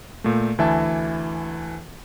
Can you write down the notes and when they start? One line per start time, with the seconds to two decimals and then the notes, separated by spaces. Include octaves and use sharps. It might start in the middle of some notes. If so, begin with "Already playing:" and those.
0.24 A#2 A3
0.58 D2 E3 E5 G#5 A5